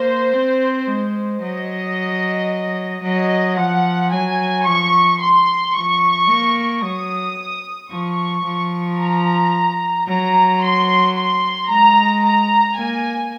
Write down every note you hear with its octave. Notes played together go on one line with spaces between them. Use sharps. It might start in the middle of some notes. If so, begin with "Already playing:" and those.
Already playing: A#3 C5
C4
G#3
F#3 D#5
F#3 D#5
F3 F#5
F#3 G#5
F3 C#6
C6
F3 C#6
A#3
F#3 D#6
F3 C#6
F3
A#5
F#3 A#5
C6
C6
G#3 A#5
A#5
A#3 G#5